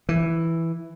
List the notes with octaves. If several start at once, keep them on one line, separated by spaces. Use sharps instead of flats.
E3